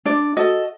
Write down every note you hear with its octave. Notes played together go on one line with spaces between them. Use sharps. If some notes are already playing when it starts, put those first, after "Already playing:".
D4 D5
F#4 A4 D#5